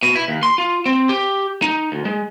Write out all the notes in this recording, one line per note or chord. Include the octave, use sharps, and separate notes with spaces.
B2
E4
D#2
C6
F4
C4
G4
D#4
D2
G#3